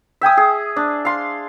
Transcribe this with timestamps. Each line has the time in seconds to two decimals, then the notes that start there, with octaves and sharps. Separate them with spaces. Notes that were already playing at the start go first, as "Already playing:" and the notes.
0.21 E5 G5 G#5 D#6
0.37 G#4
0.76 D4
1.05 F5 C6